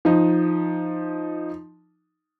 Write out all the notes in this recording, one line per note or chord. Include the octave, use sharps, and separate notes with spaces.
F3 D#4